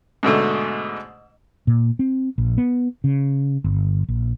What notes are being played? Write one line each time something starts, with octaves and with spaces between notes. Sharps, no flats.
G#2 B2 D3 A3
A#2
C4
A#1
B3
C#3
G1
A#1